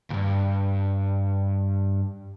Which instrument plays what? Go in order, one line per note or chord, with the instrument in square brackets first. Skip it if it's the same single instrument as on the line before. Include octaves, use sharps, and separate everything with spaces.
[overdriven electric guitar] C#2 G2